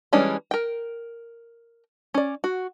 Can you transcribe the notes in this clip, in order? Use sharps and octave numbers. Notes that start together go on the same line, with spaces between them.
E3 G3 G#3 C#4 D4
A#4 G5
C#4 D5
F#4